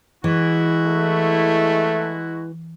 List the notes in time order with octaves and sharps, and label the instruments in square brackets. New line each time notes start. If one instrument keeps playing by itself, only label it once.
[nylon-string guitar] E3 [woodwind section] G#3 E4 F#4
[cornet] A3